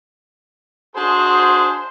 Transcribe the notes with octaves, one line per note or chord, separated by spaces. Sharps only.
D4 F#4 G#4 C5